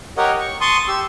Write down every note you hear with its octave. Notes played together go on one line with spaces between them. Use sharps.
G4 A#4 C#5 D#5 F#5
C#6
A5 C6 C#6 D#6
G4 E6